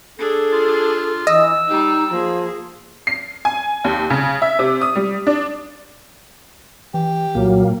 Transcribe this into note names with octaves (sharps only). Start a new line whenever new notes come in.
D4 G#4 A4
F4
E3 D#5 E6
G3 D#4 G4
F3 A#3 G#4
C7
G#5
D#2
C#3
E5
C3
D#6
G3
D4
E3 G4
C2 A#2 F#3 A#3